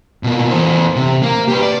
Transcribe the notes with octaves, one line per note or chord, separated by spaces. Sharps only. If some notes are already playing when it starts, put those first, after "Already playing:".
B2 A#3
E2 C5
C3
A#3
G4 B4
D5